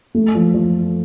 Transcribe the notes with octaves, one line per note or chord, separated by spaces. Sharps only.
A3
F3
F3